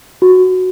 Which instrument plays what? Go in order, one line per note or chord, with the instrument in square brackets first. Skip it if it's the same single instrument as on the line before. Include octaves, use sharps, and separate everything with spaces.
[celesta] F#4